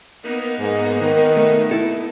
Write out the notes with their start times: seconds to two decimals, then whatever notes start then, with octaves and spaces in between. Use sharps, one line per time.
0.25 A#3 B3 D#4
0.59 G#2
1.01 D#3
1.37 A3
1.71 E4 A4